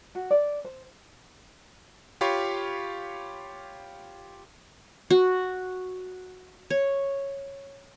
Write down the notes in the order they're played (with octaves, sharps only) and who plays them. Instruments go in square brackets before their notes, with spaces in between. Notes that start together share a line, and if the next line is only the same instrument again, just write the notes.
[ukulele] F#4
D5
C5
[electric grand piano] F4 G4 C#5 F5 B5 C#6
[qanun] F#4
C#5